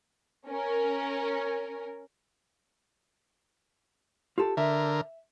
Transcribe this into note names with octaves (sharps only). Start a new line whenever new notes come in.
C#4 A#4
F4 G4 A4
D3 A#4 E5